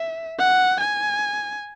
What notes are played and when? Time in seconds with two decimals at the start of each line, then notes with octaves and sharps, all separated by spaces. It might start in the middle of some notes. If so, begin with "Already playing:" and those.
Already playing: E5
0.39 F#5
0.81 G#5